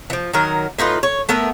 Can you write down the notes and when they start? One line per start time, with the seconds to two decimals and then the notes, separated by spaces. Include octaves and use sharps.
0.10 E3 F3
0.33 D#3 F#3 A#4
0.78 A2 D#4 F4 B4
1.03 C#5
1.29 A3 B3 A#4 E5